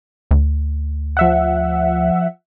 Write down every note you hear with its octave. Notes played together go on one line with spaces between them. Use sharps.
D2
F3 E5 F#5